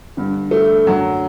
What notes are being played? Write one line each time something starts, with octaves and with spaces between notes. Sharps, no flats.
G2 D3
A3
F#2 D3 F#3